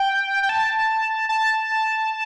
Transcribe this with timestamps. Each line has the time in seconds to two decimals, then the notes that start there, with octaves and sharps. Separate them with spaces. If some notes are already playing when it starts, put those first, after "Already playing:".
Already playing: G5
0.43 G5
0.49 A5
1.29 A5